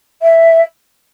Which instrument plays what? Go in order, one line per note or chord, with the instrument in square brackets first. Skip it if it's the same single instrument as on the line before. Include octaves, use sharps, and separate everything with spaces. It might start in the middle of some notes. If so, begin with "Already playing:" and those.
[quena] E5